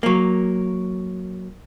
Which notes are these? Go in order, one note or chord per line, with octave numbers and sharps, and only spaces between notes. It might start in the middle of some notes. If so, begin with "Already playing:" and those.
F#3 A#3